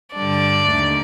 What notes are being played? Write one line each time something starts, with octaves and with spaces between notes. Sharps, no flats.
G2 D3 G3 D4 D5
D#2 D3 A3